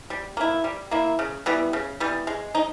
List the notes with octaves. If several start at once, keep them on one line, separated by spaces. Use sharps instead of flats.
G3
A#3 E4
G3
A#3 E4
C#3
E3 G3 B3
C#3
E3 G3 B3
G#3
D#4